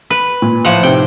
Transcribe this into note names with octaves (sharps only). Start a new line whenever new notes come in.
B4
A#2
A2 F3 F#5
C3 D#3 G5